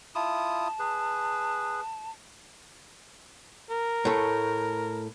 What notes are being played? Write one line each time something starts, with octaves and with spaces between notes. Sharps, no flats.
E4 F4 A5 D#6
G#4 B4
A#4
A2 A3